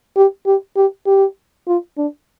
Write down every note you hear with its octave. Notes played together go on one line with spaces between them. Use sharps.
G4
G4
G4
G4
F4
D4